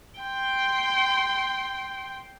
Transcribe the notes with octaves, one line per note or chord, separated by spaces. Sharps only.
G5 C6